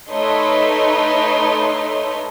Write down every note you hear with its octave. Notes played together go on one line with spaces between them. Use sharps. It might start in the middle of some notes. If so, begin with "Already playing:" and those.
A3 D#4 B4 C#5 D#5 C6